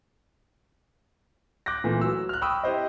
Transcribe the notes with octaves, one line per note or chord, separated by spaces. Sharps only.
D6 F#6 G6 A#6
A#2 E3 A3
F#3 E6
F6 F#6
G5 B5 C#6 D#6 E6
E4 G4 C5 D#5